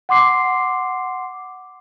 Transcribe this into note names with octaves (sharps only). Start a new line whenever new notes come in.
F#5 C6 D6 C7